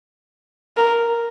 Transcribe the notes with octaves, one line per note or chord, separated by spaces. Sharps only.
A#4